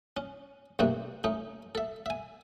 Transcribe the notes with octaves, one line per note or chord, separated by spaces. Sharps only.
C#4
B1 G2 C3 A3 A#3 D4
A3 C#4 D#4
A4 E5
E5 G#5